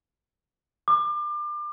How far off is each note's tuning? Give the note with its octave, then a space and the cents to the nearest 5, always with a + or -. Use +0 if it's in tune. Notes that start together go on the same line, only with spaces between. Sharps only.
D6 +30